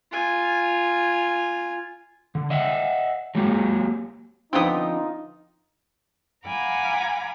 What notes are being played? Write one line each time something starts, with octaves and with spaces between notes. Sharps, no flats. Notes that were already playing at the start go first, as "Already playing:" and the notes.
F4 G#5
D3
D#5 E5 F#5
F#3 G#3 A#3 G4
D3 F3 B3 C4 D#4 F4 D6 D#6
F5 F#5 G#5 A#5 B5 D6